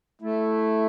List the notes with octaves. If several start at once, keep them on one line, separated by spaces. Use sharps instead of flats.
A3 E4